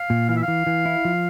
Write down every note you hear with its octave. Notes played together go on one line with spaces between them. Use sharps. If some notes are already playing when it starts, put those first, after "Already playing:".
Already playing: F5
A#2
E3 F5
E5
F5
E3
E3
E4
F3